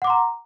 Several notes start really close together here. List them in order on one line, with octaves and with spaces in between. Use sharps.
F#5 D6 C6 A#5